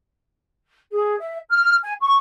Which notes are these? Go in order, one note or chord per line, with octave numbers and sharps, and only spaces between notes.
G#4
E5
F6
G#5
C#6